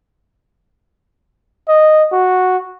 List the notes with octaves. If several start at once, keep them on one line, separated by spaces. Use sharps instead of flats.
D#5
F#4